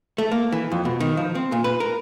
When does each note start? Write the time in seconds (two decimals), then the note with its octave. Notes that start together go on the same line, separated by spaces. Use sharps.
0.18 A3
0.32 A#3
0.52 E3
0.71 F2
0.85 B2
1.00 D#3
1.17 F3
1.35 C4
1.52 A#2
1.64 B4
1.80 A#4